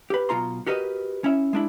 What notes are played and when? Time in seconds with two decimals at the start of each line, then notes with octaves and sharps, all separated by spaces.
0.10 G4 B4
0.29 B1 B2 F4 A#5 C6
0.67 F#4 G4 A#4 B4 D#5
1.24 C#4 E4 E5
1.53 G#3 D4 E4